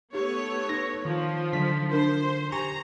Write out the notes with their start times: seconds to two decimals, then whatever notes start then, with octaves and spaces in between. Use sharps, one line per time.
0.13 A3 B3 D#4 G4 C#5
0.69 D#4 B4 A#6
1.05 D#3 F3
1.53 D3 E3 F#3 D#4 B6
1.91 D4 A#4 C5
2.52 G4 G#5 A#5 C#6